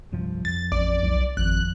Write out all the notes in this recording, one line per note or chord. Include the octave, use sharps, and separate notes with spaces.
C2 G2 F3
F2 A6
A1 D5
B1
G#1 F2 F#6